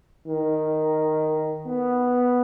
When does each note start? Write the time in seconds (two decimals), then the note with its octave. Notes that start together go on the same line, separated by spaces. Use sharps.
0.27 D#3
1.67 B3